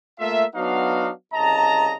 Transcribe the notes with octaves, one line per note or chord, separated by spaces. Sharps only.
A3 A#3 F4 E5
F#3 B3 D4 D#4 F#4 F5
C2 C#3 D#5 A5 A#5